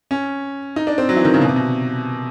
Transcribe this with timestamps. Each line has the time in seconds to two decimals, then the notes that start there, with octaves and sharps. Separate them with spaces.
0.11 C#4
0.76 D#4
0.87 D4
0.98 C4
1.09 F#3
1.16 E3
1.25 D#3
1.34 C#3
1.41 B2
1.49 C3
1.56 B2